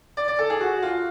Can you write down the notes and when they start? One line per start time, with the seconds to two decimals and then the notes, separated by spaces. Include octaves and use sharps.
0.17 D5
0.28 D5
0.39 A4
0.50 G#4
0.61 F#4
0.82 F4